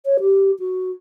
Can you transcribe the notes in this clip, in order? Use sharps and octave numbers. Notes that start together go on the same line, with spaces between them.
C#5
G4
F#4